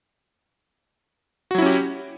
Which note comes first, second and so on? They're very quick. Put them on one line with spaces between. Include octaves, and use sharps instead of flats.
F#4 F#3 E4 C#4 G4